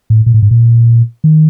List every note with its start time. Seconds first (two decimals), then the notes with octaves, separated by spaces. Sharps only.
0.10 A2
0.26 A#2
0.34 A2
0.42 G#2
0.51 A#2
1.24 D#3